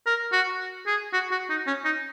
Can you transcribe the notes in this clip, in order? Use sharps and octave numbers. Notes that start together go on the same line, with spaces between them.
A#4
F#4
G#4
F#4
F#4
D#4
C#4
D#4